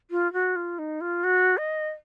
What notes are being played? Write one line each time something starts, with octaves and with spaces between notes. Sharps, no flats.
F4
F#4
F4
D#4
F4
F#4
D#5